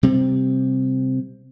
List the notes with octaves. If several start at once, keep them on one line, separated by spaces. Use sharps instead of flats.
C3 G3 C4